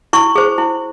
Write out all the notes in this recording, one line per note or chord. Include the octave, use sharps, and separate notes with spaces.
E4 C#6
G#4 C5
E4